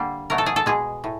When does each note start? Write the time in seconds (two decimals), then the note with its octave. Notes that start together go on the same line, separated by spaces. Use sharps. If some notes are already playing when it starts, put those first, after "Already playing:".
Already playing: D3 G3 A#3
0.30 B2 F#3 A3 A#4
0.38 A4
0.46 G#4
0.56 A4
0.66 B2 G#3 G#4
1.04 A2